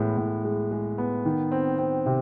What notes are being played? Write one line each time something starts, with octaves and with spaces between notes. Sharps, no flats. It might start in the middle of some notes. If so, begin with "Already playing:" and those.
Already playing: A2 E3 G#3 B3
A2
G#3
G#3
B3
D#3
C4
C4
C3